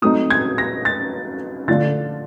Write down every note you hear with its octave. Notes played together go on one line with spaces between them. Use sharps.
F#3 A3 C4 D#4 D#6
G#6
A#6
A6
D3 F3 A3 D4 F4 A6